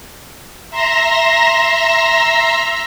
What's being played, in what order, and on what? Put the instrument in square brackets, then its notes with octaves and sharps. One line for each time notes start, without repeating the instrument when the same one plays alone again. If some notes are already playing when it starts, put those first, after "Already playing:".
[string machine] E5 A#5 C6 E6 A#6